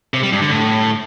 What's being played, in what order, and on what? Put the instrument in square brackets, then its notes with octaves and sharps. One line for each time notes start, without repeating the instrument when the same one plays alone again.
[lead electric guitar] C3
G3
G2
D3
A2